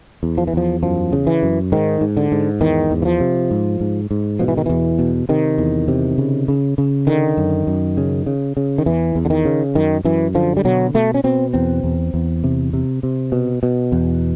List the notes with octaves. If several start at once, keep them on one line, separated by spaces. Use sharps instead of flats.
E2
F3
E3
E2 F3
F#2 F3
C#3
E3
F#2
G#2 D#3
G#2
D3
G#2
E2 D#3
E2
E3
F3
C3
G#2
G#2
G#2
B2 F3
E3
D#3
E2 E3
B2
C3 D#3
E2
C3
C#3
C#3
C#3
D3 D#3
F#2
F#2
C#3
C#3
C#3
D#3
E2 E3
E2
D3
D#3
C#3
F#2 D#3
F#2 E3
D3 F3
G3
B2 F#3
B2 A3
C#4
B2 C4
E2 C4
E2
E2
C3
C3
C3
B2
B2
E2